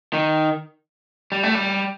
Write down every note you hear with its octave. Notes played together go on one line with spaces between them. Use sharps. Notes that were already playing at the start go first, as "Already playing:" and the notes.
D#3
G3
A3
G3